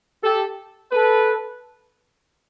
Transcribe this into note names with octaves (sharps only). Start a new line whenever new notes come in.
G4 A4
A4 B4